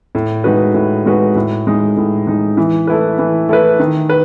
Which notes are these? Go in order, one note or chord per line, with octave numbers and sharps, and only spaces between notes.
A2
G#3 D#4 F#4 B4
A2
G#3 D#4 F#4 B4
A2
G#3 D#4
A2
G#3 D#4
E3
A3 E4 B4
E3
A3 E4 B4
D#3
B4